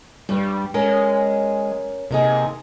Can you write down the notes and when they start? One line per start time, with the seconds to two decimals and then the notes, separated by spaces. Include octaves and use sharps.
0.29 G2 G3
0.74 G#3 C#4 A#4
2.11 C3 A#3 D#4 G#4